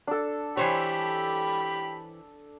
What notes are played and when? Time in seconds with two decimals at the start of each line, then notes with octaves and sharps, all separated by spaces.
0.07 D4 A4
0.57 E3 G4 C5 C#5 B5